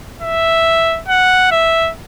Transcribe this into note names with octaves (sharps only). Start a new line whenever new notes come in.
E5
F#5
E5